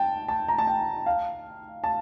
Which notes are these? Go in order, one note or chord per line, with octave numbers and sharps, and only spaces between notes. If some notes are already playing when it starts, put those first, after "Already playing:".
Already playing: G5 A5
A5
A#5
A5
G5
F5
A5